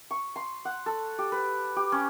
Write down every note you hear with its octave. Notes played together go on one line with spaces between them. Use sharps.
C#6
C6
F#5
A4
G4
B4
G4
C#4